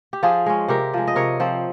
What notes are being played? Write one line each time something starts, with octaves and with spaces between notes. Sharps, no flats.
G4
F3 F4 G#4
G#3 C#4
C3 G4 A#4
F3 G#3
D#5
C3 A#4 C#5
F3 C4